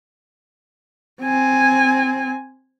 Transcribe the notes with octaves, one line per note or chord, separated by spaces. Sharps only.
C4 G#5